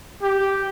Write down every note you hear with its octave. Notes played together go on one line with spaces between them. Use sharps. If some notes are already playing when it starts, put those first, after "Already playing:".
G4